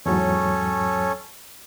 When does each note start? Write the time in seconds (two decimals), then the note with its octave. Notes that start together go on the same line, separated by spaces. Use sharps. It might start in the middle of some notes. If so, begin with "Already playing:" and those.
0.06 E2 G#2 F#3 C#4 A4 C#5